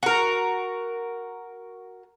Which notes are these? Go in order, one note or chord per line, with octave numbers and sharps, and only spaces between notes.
F#4 A#4